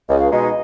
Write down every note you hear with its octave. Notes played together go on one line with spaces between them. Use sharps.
C#2 D#5
F5
B2 G#3 D#4 D#5